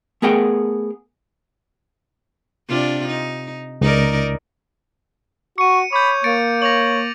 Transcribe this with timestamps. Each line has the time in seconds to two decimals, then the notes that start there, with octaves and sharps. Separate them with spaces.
0.22 A3 B3 G#4 A#4 F#5 G5
2.68 C3 D4 F4
3.07 D#4
3.81 C#2 D#4 A#4 D5
5.58 F#4 C#6 C#7 D#7
5.92 C#5 B5 D6 G6
6.24 A#3 A6 C#7 D7
6.62 C#5 A#6 F7 F#7